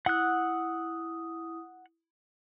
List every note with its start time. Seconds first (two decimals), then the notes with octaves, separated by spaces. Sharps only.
0.06 E4 F#5 D#6 F#6